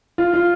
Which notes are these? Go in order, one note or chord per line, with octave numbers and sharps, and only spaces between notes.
F4
F4